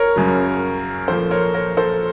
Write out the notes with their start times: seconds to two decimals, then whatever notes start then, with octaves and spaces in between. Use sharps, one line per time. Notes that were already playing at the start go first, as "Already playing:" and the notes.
Already playing: A#4 C#5
0.16 F#2 C#3 F#3
1.08 A#2 F3 A4 C5
1.31 A#4 C#5
1.54 A#4 C#5
1.77 A4 C5